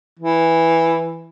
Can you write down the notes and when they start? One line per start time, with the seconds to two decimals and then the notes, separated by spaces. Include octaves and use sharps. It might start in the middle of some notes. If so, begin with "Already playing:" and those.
0.19 E3